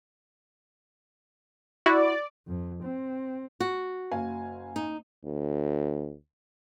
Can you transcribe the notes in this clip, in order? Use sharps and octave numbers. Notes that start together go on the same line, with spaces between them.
E4 F#4 D5
F2
C4
F#4
F#1 F5 G#5
D#4
D2